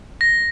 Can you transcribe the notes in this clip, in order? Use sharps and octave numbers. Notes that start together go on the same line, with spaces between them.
A#6